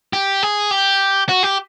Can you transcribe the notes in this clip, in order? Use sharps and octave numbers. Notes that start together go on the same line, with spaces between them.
G4
G#4
G4
F#4
G4